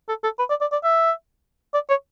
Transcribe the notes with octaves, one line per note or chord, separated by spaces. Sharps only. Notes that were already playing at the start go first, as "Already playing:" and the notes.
A4
A4
B4
D5
D5
D5
E5
D5
C#5